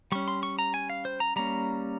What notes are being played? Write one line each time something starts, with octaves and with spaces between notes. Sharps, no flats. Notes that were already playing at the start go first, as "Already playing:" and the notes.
G3 C#4 C#6
C6
C#6
A#5
G#5
F5
C5
A#5
G3 A#3 C#4 A#5